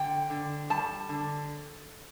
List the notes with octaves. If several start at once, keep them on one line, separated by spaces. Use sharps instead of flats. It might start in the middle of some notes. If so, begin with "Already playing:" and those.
Already playing: D3 G5
D3
G3 A5
D3